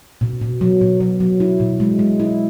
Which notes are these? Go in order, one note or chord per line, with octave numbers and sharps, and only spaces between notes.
B2
B2
F#3
B2
F#3
F#3
E4
B2
G#3
G#3
E4